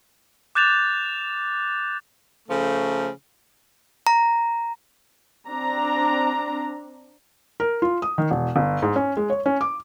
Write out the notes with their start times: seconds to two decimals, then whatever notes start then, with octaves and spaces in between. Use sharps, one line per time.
0.55 D6 F#6 G6 A6 E7 F7
2.48 C#3 F3 A3
4.07 A#5
5.49 C4 D4 A#5
7.60 A#4
7.82 F4
8.02 D#6
8.18 D#3
8.31 E1
8.56 G1
8.82 G#2
8.96 C#4
9.17 G#3
9.30 C#5
9.46 C#4
9.61 D6